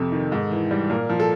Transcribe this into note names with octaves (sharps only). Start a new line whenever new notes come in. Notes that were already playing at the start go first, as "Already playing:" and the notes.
Already playing: F2 C3 A4
D#3
G#2
E3
G3
A#2 A#4
F3
A4